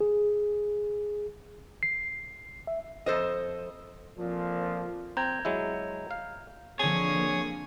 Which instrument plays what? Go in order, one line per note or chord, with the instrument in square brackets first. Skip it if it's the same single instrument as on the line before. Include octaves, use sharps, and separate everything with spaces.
[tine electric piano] G#4
C7
E5
[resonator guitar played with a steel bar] F2 A4 C5 D#5
[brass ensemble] F2 A#2 F3
[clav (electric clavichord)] C4 [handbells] A#5 G6 G#6
[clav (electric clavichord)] F#3 G#3 E4
F5
[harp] D3 C4 [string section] F3 A#3 [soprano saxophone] G#4 [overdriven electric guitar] C#5